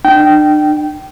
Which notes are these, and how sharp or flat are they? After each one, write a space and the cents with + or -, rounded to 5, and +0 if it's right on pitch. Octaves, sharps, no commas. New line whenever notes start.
D4 +40 G5 -20